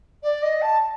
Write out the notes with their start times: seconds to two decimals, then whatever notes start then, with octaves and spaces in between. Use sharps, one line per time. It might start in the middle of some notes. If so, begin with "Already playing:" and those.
0.23 D5
0.42 D#5
0.62 A5